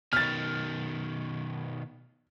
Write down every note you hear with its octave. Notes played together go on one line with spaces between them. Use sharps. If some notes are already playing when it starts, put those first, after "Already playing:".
B2 D#3 F6 A6